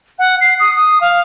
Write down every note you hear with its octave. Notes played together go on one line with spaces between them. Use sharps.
F#5
C7
D#6
D#6
F5